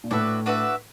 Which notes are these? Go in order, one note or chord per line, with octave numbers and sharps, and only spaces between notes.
A#2
A2 D4 F#4 B4 E5
D4 F#4 B4 E5